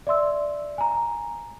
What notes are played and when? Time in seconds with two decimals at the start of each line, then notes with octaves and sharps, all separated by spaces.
0.07 D5 E5 C6 E6
0.78 G#5 A#5